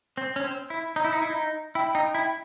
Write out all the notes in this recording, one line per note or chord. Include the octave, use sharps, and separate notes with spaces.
C4
C#4
C4
E4
D#4
E4
D#4
E4
D#4
E4 G5
D#4
E4